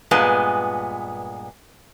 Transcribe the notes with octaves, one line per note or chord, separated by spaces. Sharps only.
G2 A#2 G#3 B3 G#5